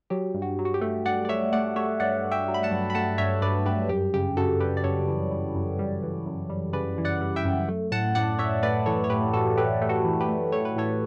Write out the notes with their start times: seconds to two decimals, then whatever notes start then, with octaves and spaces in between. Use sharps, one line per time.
0.10 F#3 G4
0.34 G2
0.42 F#4
0.59 F#3
0.65 F#4
0.74 G4
0.81 A3
1.06 G2 D5 F#5
1.25 D5
1.29 A3 C#5 E5
1.53 A3 D5 F#5
1.76 A3 C#5 E5
2.00 G2 D5 F#5
2.24 G2
2.31 E5 G5
2.48 F#3
2.54 B5
2.63 F#5 A5
2.71 G2
2.90 B5
2.95 A3 F#5 A5
3.18 G2 C#5 E5
3.42 G2 B4 D5
3.65 G2 G4 B4
3.89 F#2 G4
4.14 C#3 G4
4.37 C#3 F#4 A4
4.60 G3 G4 B4
4.77 D5
4.84 F#2 A4 C#5
5.08 E3
5.31 E3
5.55 F#2
5.79 G3
6.03 E3
6.26 F#2
6.50 G3
6.73 C#3 B4 D5
6.98 E3
7.05 D5 F#5
7.21 G3
7.36 E5 G5
7.45 F#2
7.68 A3
7.92 A2 F#5 A5
8.15 A2 D5 F#5
8.39 A2 C#5 E5
8.63 A3 B4 D5
8.86 E3 A4 C#5
9.04 C#5
9.10 A2 G4 B4
9.33 A2 F#4 A4
9.57 A3 G4 B4
9.82 A3
9.89 F#4 A4
10.05 E3
10.21 G4 B4
10.29 A3
10.52 A3 C#5
10.65 B4
10.76 A2 A4 C#5